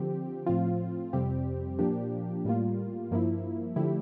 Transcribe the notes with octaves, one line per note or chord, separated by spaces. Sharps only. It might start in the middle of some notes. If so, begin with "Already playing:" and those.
Already playing: D3 F3 C4 G4
A2 F3 C4 F4
F2 C3 G3 C4 G4
A#2 F3 A#3 D4 G4
A2 G3 A#3 F4
G2 F3 A#3 E4
D3 F3 A3 E4 G4